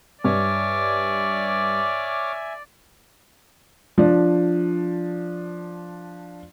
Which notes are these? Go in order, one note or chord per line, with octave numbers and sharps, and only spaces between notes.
G2 C#5 D5 E5 G#5 D6 F6
F3 D4